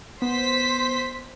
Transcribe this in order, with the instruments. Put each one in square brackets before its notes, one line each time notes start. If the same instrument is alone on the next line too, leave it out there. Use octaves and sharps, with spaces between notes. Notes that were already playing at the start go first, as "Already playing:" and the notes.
[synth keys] B3 [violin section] C5 B6